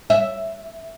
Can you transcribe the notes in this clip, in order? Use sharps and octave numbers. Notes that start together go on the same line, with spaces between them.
E5